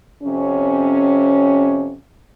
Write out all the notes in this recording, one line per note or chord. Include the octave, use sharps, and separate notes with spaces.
F2 C3 C#4